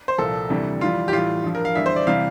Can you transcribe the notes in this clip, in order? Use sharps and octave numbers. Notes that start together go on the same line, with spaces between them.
C5
C2 A#2 F3 A4
D2 C3 E3 G3
F2 E3 G3 F4
G4
A2 E3 G3 F4
G2 F3
A#4
F5
E2 D3 G3 E5
C5
D5
C3 E3 G3 F5